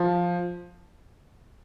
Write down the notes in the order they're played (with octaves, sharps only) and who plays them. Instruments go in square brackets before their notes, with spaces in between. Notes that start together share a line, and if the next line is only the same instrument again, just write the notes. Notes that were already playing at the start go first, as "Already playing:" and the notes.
Already playing: [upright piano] F3